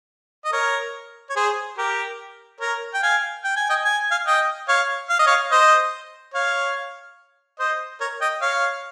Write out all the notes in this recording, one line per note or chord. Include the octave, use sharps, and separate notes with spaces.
D#5
A#4 C#5
C#5
G#4 C5
G4 A#4
A#4 C#5
G5
F5 G#5
G5
G#5
D#5 G5
G#5
F5 G#5
D#5 G5
C#5 F5
F5
D#5
C#5 F5
C5 D#5
C#5 F5
C5 D#5
A#4 C#5
D#5 G5
C#5 F5